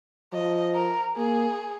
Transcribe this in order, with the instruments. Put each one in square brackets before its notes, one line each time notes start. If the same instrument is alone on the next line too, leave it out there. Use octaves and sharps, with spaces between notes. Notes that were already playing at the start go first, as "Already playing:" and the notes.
[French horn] F3 [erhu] D#5
[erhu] A#4
[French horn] A#3 [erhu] G#4